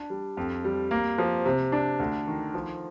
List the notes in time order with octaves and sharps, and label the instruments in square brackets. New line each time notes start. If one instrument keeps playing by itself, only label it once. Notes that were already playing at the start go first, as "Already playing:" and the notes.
Already playing: [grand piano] D4
G3
F2
G3
A#3
F3
C3
D4
D2
D#3
F3